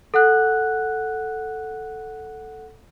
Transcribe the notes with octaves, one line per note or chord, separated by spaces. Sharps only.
A4 F#5 F#6